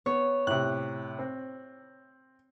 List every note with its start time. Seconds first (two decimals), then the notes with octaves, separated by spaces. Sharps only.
0.06 B3 C#5
0.47 A2 C3 F#6
1.19 C4